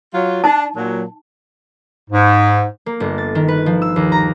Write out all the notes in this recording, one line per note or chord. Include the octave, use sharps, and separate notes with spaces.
F#3 F4
D4 D#4 A5
A#2 F#3
G#2
A#3
G1
A6
D#3
B4
F3
E6
D#2
A#5